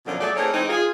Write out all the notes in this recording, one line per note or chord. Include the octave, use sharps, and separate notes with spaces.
F#2 B2 D3 F3
F#3 A3 G#4 A4 D5
A3 A#3 C4 D#4 G#4 C#5
E3 G#3 C4 D#4
F4 G#4